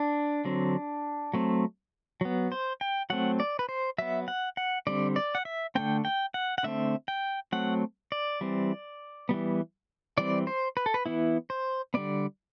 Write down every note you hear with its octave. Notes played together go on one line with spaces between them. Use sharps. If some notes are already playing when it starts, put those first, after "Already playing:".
Already playing: D4
D3 F#3 C4
F#3 A3 C4
F#3 B3
C5
G5
F#3 A3 C4 F#5
D5
B4
C5
F#3 B3 E5
F#5
F#5
D3 G3 C4 D5
D5
F#5
E5
D3 A3 C4 G5
G5
F#5
F#5
D3 A3 C4 E5
G5
F#3 A3 C4 F#5
D5
E3 G3 C4
E3 G3 B3
E3 G3 C4 D5
C5
B4
A4
B4
E3 B3 E4
C5
D3 G3 B3 D5